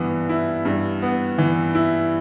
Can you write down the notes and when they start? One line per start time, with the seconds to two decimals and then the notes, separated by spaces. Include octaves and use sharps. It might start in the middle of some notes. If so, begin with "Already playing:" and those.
Already playing: G2 E3 B3
0.29 E4
0.65 G2
1.02 B3
1.38 E3
1.75 E4